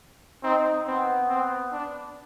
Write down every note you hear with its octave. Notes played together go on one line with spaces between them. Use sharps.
C4 D#4
B3 C4
C4
D4